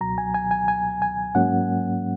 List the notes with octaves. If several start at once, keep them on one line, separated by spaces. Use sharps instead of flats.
C#2 B2 F#3 A#5
G#5
G#5
G#5
G#5
G#5
G#2 F#3 A#3 C#4 F#5